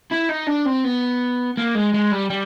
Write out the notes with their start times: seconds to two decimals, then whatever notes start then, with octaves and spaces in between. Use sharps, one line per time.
0.12 E4
0.30 D#4
0.48 D4
0.66 C4
0.85 B3
1.57 A#3
1.75 G#3
1.94 G#3
2.12 G3
2.30 G3